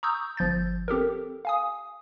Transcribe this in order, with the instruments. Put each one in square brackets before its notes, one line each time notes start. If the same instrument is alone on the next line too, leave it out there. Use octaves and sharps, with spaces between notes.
[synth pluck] A#5 C#6 D#6 E6 G6
G1 F3 G6 A6
C4 G4 A4 A#4
F5 G#5 D#6